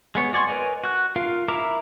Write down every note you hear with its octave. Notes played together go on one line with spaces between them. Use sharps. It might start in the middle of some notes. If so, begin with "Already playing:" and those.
G#3 B3 C#5
F#4 D5 G#5 C6 C#6
A#4 B4 C#5 D#5 G#5
F#4 F#6
F4 A#4 F5
E4 A#4 E5 A#5 D6